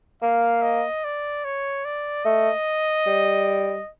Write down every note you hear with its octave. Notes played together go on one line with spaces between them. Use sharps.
A#3 F5
D#5
D5
C#5
D5
A3 D#5
G3